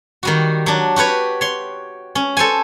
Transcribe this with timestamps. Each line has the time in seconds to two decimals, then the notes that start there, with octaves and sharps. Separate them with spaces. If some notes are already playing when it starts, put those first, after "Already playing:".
0.23 D#3 G3 F#4
0.66 F#3 D4
0.96 F#4 G4 B4 C#5
1.41 C#5 C6
2.15 C#4
2.37 A4 C5 C#5 G#5